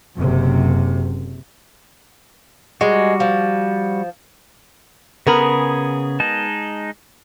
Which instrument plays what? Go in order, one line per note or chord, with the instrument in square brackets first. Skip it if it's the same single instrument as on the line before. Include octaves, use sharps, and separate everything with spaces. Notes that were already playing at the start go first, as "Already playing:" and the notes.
[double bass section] F#1 F#2 C3
[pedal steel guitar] G3 F#4 [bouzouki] G#3
[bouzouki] F3
[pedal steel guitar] C#3 G#4 B5 [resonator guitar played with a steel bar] B3 A#4
[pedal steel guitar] G#3 D#4 A5